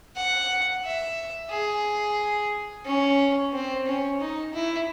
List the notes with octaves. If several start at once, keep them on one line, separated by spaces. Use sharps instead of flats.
F#5
E5
G#4
C#4
C4
C#4
D#4
E4